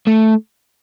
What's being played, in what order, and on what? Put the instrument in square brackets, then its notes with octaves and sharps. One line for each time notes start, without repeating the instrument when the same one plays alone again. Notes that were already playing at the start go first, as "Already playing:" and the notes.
[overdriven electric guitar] A3